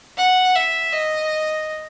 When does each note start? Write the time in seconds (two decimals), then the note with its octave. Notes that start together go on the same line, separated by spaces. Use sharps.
0.17 F#5
0.55 E5
0.93 D#5